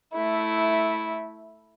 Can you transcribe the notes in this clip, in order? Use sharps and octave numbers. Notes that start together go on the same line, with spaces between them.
A3 E4